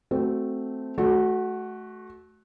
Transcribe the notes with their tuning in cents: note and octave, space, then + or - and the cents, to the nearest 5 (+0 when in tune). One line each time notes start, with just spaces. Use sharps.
A3 +0 C4 -5 F#4 +5
A3 -30 F#4 +5